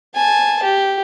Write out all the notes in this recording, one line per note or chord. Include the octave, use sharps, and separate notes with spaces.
G#5 A5
G4